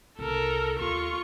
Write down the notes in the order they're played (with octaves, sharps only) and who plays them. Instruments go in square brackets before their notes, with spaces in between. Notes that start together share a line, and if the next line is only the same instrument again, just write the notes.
[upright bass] C2 [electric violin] A4 A#4
[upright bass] D#2 [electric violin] F4 C#6